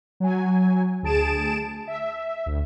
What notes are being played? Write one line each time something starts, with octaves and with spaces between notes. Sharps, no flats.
F#3 G#5
D2 G#4 A5 D7 E7
E5
D2